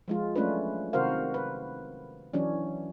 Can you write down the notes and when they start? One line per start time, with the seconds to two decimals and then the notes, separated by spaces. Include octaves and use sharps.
0.08 F3 G#3 F4
0.36 F#3 A3 C#4 D4 F4 B4
0.93 C3 D#3 F#4 A#4 C5 F5
1.34 B4
2.33 E3 F#3 C#4 D4